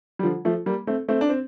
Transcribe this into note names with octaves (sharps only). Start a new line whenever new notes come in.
G3
D3 F3
F3 A3
G3 A#3
A3 C4
A3 C4
D4
C4